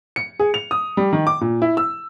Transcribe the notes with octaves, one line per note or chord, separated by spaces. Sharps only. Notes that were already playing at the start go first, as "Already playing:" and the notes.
C#7
G#4
F7
D#6
G3
D#3
D6
A#2
E4
E6